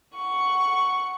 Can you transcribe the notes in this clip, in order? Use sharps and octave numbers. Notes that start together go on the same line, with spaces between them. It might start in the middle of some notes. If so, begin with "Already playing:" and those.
F#5 C#6